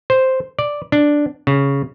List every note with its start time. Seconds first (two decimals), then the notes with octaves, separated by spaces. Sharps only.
0.10 C5
0.59 D5
0.92 D4
1.47 C#3